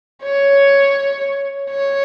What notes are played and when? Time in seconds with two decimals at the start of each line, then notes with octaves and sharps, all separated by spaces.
0.23 C#5
1.70 C#5